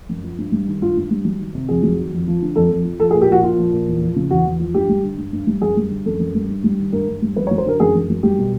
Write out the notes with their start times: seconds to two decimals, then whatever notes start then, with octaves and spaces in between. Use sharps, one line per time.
0.09 F#2
0.24 F3
0.38 G2
0.52 G3
0.67 D#3
0.82 G2 F4
0.97 G2
1.11 G3
1.25 F#3
1.39 D#3
1.55 C3
1.68 F2 G#4
1.83 F#3
1.98 D#3
2.13 F2
2.28 F3
2.42 D3
2.56 F2 A4
2.70 F2
2.85 F3
3.00 F3 A4
3.11 G#4
3.14 A#2
3.22 G4
3.29 F3 F#4
3.43 A#2 F4
3.58 F3
3.73 A#2
3.88 E2
4.02 F3
4.16 C#3
4.31 E2 F#4
4.46 E2
4.60 F3
4.74 G2 G4
4.89 G3
5.03 D3
5.18 G2
5.33 G2
5.47 G3
5.61 F#2 G#4
5.77 G3
5.91 D3
6.06 F#2 A4
6.19 F#2
6.35 G3
6.49 G2
6.64 G3
6.79 D#3
6.92 G2 A#4
7.08 G2
7.22 G3
7.36 F#2 B4
7.47 C#5
7.51 F#3
7.58 C5
7.66 D3 A#4
7.80 F#2 G#4
7.95 F#2
8.10 F#3
8.23 G3 G4
8.38 B2